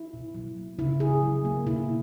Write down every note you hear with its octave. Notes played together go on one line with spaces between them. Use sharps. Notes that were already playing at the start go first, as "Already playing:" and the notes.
Already playing: E4
B2
F#3
A#3
C#3 E4
C#3 G#4
F#3
A#3
B2 E4